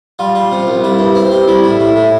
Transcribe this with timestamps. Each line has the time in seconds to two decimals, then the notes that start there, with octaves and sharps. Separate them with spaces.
0.19 G3 F4
0.35 G3
0.52 C3
0.67 C2
0.83 G3 E4
0.99 G2
1.15 C4
1.31 G3
1.48 G3 E4
1.64 A2
1.80 A2
1.96 A2